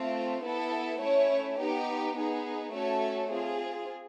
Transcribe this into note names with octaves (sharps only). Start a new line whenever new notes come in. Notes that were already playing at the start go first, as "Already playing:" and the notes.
Already playing: A3 C4 F4
B3 E4 A4
A3 C#4 E4 C#5
B3 D#4 G4
B3 D#4 G#4
A3 C#4 F#4 A4 C#5
C4 F4 G#4